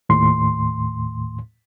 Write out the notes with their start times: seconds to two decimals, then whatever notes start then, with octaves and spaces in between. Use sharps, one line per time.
0.09 D#2 A2 C6